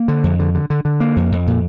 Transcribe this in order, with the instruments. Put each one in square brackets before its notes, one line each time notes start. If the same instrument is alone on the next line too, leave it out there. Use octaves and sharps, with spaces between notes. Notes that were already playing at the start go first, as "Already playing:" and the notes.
Already playing: [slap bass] A#3
D3
F2
D3
D3
D3
D3
A#3
F2
F2
A#2